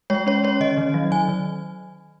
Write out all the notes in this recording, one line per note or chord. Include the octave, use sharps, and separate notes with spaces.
G#3 C#5
C#4 C#5
C#4 C#5
D#3 D#5
D#3
F#3
D#3 G#5
D#3